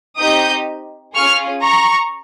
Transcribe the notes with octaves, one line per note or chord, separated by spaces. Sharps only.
C4 D#4 G4 D#6 G6
C#4 F4 G#4 C#6 F6
A#5 C#6